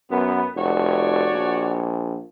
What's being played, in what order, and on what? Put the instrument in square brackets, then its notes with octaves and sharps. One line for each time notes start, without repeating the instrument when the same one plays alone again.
[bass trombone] F#2 [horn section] B3
[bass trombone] F1 [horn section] F#4 C#5 D5
[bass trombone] A#1